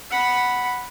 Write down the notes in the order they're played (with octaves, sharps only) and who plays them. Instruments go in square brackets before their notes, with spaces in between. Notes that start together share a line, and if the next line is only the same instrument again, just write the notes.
[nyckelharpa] F#5 B5